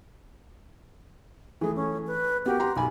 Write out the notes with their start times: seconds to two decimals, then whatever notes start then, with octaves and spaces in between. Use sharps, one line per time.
1.61 E3 A3 G#4
1.75 C#4
2.07 B4
2.46 B3 F#4 G4 A#4
2.60 A#5 C6
2.76 B1 G#5 B5